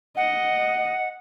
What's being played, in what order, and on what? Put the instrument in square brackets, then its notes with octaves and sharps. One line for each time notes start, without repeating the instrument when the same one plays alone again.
[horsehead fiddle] D#5 [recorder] F#5